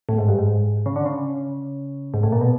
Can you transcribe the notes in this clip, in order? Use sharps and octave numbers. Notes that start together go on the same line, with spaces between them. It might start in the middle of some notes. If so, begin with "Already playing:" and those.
A2
G#2
G2
G#2
C#3
D3
C#3
G#2
A2
A#2
B2